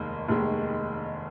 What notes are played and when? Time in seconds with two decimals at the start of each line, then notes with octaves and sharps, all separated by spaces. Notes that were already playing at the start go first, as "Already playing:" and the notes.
Already playing: F1 D#2 D#3 G#3
0.28 F1 D#2 D#3 G#3